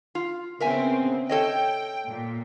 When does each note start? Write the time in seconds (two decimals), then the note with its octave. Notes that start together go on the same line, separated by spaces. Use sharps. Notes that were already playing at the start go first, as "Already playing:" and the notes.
0.15 F4
0.60 C#3 B3 C4 A#4 E5 G#5
1.29 A4 C#5 D#5 G5
2.08 A#2